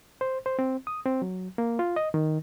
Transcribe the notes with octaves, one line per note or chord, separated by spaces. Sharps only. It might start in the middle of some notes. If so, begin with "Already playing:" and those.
C5
C5
C4
D#6
C4
F#3
A#3
F4
D#5
D#3